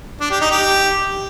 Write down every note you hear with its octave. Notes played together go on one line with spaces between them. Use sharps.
D4
G4
D#4
G4